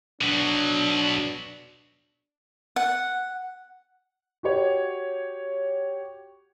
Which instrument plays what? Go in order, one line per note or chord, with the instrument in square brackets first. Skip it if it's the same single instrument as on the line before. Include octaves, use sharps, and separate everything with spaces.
[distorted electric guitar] B2 F#3 [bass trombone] D4
[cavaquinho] F#5
[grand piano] F#4 G4 C#5